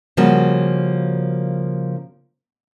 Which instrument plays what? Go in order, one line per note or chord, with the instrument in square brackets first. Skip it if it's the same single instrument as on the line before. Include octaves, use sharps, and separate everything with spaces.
[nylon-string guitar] C#3 F3 G3 A#3 F#4